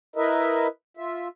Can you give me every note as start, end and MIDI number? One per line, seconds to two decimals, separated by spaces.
0.16 0.67 64
0.16 0.67 70
0.16 0.67 71
0.16 0.67 75
0.16 0.67 76
0.97 1.28 65
0.97 1.28 76